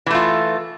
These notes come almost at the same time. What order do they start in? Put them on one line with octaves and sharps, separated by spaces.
E3 A3 F4